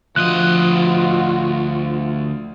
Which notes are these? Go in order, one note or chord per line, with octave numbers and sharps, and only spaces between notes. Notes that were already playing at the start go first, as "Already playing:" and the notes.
D2 F3 F4 F#4 D#5 F#6